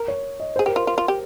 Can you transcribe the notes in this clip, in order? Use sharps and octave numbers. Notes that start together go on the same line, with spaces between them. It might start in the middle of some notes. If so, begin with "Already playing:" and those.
Already playing: A#4
C#5
D#5
C5
G#4
G4 A#4
F4 C5
F4
F4
G4